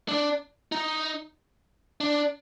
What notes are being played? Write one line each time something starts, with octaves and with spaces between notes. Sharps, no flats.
D4
D#4
D4